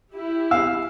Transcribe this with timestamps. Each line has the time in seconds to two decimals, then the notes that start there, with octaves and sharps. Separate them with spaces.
0.10 E4 G4
0.51 F5 E6